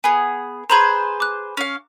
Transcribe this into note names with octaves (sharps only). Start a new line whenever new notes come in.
B3 G#4 G#5
G#4 B4 C5 A#5 B5
D6 F#6
C#4 F5